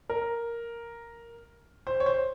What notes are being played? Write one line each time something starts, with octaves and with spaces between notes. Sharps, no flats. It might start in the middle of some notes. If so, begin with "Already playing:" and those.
A#4
C5
C#5
C5